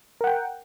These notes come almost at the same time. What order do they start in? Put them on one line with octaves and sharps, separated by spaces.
A#4 F#5 G5